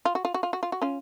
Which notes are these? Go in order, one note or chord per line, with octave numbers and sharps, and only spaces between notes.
F4
F#4
F4
F#4
F4
F#4
F4
F#4
C#4 F4